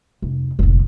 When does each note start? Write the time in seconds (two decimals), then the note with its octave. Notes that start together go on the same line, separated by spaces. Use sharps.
0.22 F1
0.59 F1 A#1